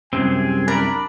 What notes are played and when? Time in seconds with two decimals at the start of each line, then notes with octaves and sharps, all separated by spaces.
0.13 C2 F#2 C3 C4 G#4 G#5
0.68 D4 A#4 D5 B5